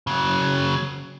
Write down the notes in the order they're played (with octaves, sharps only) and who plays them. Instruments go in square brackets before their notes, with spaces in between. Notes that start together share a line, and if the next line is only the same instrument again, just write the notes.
[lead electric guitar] C#3 F#3